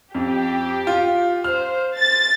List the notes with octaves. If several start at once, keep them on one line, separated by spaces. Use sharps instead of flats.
F2 G4
F4
C5 F6
A6